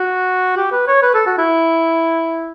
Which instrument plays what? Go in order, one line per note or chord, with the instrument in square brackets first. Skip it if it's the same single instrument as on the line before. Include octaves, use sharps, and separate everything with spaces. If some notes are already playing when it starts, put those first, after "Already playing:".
Already playing: [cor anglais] F#4
G4
B4
C#5
B4
A4
F#4
E4